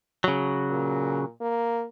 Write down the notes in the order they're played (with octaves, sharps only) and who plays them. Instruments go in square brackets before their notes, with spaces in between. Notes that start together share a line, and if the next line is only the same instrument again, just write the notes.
[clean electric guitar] C#3 F#3
[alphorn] A#2
A#3